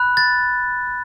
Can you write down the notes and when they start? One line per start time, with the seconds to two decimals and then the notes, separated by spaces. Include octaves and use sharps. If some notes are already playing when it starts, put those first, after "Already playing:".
Already playing: B5 F#6
0.17 A6